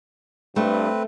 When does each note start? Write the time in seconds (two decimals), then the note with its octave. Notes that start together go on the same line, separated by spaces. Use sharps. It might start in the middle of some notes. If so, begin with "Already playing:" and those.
0.56 G2 A3 C4 B4